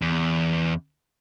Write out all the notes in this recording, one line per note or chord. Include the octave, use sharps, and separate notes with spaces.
E2